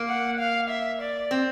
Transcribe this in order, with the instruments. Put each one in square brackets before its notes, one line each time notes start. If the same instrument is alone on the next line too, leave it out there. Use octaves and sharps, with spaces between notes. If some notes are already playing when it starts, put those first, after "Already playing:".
Already playing: [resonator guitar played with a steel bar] A#3
[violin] F#5
F5
E5
D5
[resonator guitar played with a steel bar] C4